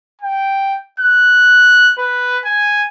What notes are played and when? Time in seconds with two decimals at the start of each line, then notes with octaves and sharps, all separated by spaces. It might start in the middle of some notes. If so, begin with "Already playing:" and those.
0.22 G5
1.00 F#6
1.98 B4
2.45 G#5